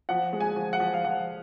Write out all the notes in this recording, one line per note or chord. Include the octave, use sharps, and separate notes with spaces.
F3 F#5
G#3
G#5
F3
F#5
F3
F5
F3 F#5